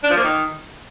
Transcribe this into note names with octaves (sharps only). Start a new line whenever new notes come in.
D4
F3
A#3
D#3